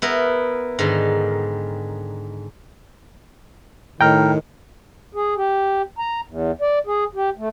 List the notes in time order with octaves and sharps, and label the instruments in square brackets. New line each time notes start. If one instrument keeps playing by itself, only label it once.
[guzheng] B3 E4 A#4
G#2 D3 D#3
[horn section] A2 D#3 [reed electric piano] G5 A#5 F6
[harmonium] G#4
G4
A#5
E2
D5
G#4
G4
A3